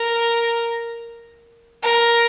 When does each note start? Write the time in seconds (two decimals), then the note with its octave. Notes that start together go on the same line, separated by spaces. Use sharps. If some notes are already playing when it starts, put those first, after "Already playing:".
Already playing: A#4
1.83 A#4